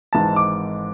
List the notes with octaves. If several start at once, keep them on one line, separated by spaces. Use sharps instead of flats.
G#1 G#2 E3 A5
D6